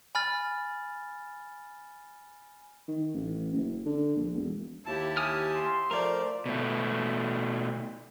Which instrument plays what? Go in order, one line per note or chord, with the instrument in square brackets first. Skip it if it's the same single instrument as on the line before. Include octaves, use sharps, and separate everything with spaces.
[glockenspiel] G#5 B5 F6 A6
[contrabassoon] D#3
A1
F#1
D3
A#1
E1
[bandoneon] D#2 A5 [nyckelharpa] E4 G4
[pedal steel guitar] G#5 D#6 F6
[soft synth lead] C6
[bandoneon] F3 A3 C5 [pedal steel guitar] A#4 [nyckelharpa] D5
[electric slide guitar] B2 A3